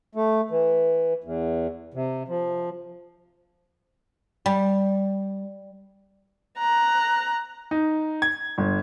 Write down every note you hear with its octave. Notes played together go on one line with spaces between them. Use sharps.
A3
E3
E2
C3
F3
G3
A#5 F#6
D#4
G#6
G1